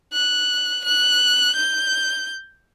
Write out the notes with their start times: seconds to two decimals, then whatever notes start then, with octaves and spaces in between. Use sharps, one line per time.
0.14 F#6
0.85 F#6
1.56 G6